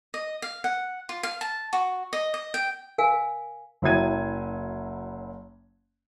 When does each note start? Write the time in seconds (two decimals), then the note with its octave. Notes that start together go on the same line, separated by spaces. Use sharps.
0.14 D#5
0.42 F5
0.64 F#5
1.09 F4
1.23 F5
1.41 A5
1.73 F#4
2.13 D#5
2.34 D#5
2.54 G5
2.98 A#4 F5 G#5
3.82 F#1 F#3 E4 G5 G#6 D#7